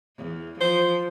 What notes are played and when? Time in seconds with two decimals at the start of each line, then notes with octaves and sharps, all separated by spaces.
0.18 E2
0.61 F3 C5